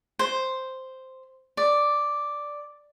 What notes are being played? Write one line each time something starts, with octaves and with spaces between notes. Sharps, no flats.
C5
D5